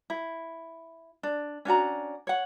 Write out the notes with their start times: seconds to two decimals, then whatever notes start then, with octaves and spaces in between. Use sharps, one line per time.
0.10 E4
1.23 D4
1.65 C#4 D4 F#4 A#5
2.27 C#5 F#5